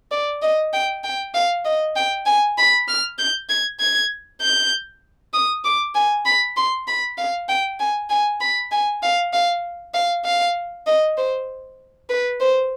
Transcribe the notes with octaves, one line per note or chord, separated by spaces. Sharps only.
D5
D#5
G5
G5
F5
D#5
G5
G#5
B5
F6
G6
G#6
G#6
G6
D#6
D6
G#5
B5
C6
B5
F5
G5
G#5
G#5
B5
G#5
F5
F5
F5
F5
D#5
C5
B4
C5